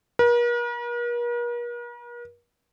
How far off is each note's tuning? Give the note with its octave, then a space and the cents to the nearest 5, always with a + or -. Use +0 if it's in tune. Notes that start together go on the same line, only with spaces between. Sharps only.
A#4 +45